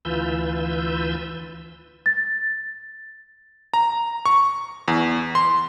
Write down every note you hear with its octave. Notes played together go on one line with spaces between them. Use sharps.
D2 E3 F4 B4 E6 G6
A6
A#5
C#6
E2
C6